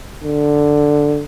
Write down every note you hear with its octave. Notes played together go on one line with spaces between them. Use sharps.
D3